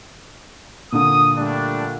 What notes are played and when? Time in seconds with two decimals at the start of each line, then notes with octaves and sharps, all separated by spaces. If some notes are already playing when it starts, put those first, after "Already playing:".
0.92 A#2 D3 D#6
1.36 G3 A3 D4